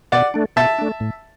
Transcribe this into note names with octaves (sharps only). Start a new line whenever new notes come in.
B2 D5 F#5
A3 D4
B2 E5 A5
A3 D4
A2